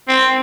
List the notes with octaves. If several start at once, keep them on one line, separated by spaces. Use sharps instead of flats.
C4